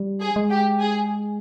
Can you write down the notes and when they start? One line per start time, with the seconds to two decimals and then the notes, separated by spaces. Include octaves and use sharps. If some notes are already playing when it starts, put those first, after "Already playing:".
Already playing: G3
0.21 G#4
0.36 G#3
0.50 G4
0.80 G#4